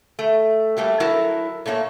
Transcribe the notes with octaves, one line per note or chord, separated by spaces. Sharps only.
A3
F#3 G3 A3 A#3
F#3 E4 F#4 A4 A#4
A#2 A3 A#3 C#5